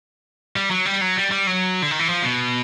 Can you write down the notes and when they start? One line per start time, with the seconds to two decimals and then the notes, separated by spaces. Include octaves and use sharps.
0.56 G3
0.71 F#3
0.86 G3
1.01 F#3
1.17 G3
1.32 G3
1.47 F#3
1.82 D3
1.91 D#3
1.99 E3
2.08 F3
2.23 B2